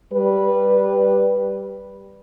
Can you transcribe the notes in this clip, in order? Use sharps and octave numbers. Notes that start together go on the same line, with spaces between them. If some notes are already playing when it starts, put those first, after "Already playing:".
G3 B4